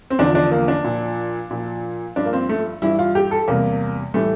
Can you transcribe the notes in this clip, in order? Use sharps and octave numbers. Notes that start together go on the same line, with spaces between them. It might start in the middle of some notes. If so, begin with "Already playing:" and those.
C4
E2 D3 F3 D4
D4
A#3
D4
A#2 F3
A#2 F3
G2 F3 D4
A#3
C4
A3
G2 E3 G3 E4
F4
G4
A4
E2 C3 G3 A#3
A2 E3 G3 A3